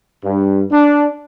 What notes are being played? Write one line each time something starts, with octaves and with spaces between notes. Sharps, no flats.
G2
D4